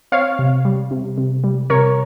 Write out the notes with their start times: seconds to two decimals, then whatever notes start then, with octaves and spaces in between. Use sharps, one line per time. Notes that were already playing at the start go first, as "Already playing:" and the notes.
0.12 C4 C#5 F5
0.39 C3
0.65 G3
0.91 C3
1.18 C3
1.44 G3
1.70 C3 A#4 C#5